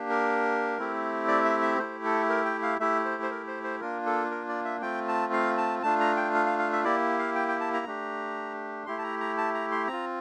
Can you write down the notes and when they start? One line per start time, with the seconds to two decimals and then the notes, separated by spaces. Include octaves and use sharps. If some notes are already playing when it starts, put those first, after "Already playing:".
Already playing: A#3 D4 G4
0.10 A#4
0.78 A3 C4 E4 G4
1.28 D5
1.44 E5
1.62 E5
1.78 A3 E4 G4 C5
2.05 A4
2.30 A#4
2.45 G5
2.63 F5
2.80 A3 E4 G4 E5
3.05 C5
3.23 C5
3.31 A#4
3.48 C5
3.64 C5
3.80 A#3 D4 F4 A#4
4.06 A4
4.31 A#4
4.49 D5
4.65 E5
4.81 A3 C4 F4 G5
5.08 A5
5.33 F5
5.57 A5
5.83 A3 D4 F4 A5
6.00 A#5
6.17 G5
6.34 F5
6.47 F5
6.59 F5
6.72 E5
6.84 A#3 E4 G4 D5
7.19 F5
7.36 G5
7.48 G5
7.60 A5
7.73 A#5
7.86 A3 D4 G4
8.86 A3 E4 G4 C6
8.98 A5
9.03 A#5
9.21 A#5
9.38 A5
9.54 A#5
9.72 C6
9.88 C4 F4 A#5